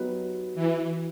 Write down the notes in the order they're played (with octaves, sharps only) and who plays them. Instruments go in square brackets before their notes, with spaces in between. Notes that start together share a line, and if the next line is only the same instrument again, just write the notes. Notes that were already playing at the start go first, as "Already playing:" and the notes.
Already playing: [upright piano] F#3 B3 D#4 G4 B4
[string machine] E3